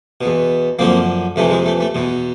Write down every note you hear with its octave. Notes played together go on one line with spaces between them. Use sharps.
B2
E2
F#2 D3 F3 A#3 C4
F2 C3 E3 A3
G#3
A3
A3
E2 B2